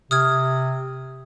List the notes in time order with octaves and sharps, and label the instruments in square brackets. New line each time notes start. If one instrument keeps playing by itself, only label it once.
[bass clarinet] C3 [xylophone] D#6 F6 G#6